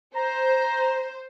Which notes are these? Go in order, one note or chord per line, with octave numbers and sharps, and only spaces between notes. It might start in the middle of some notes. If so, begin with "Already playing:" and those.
C5 A#5